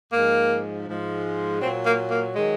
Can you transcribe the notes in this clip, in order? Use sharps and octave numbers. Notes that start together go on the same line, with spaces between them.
G#2 F3 G#3 A#3
G#2 F3 G#3
A#2 F#3 C4
A#3
A#3
D#3 F#3 G#3